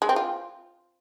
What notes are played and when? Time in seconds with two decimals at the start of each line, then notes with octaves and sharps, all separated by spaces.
0.02 G#3
0.09 C4
0.16 F4